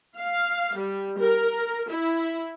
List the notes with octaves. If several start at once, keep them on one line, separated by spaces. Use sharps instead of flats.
F5
G3
A#4
E4